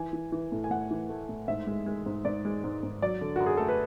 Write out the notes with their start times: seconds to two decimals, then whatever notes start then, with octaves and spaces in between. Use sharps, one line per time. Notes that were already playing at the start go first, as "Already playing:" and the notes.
Already playing: E3 G#5
0.13 E3
0.32 E3
0.52 A2
0.64 G#5
0.70 A2 F#5
0.91 E3
1.09 A3
1.29 A2
1.48 G#2 E5
1.67 G#3
1.86 G#3
2.06 G#2
2.25 G#2 D5
2.45 G#3
2.64 G#2
2.83 G#2
3.02 F#3 D5
3.21 D3
3.36 F#2 F#4
3.46 G#4
3.57 A3 A4
3.68 B4